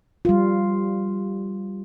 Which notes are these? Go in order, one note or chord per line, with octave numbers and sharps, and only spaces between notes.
G3 F4